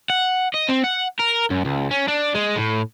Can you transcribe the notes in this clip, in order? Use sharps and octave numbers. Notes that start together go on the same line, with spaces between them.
F#5
D#5
C4
F#5
A#4
F#2
C#2
C#4
D4
G#3
A2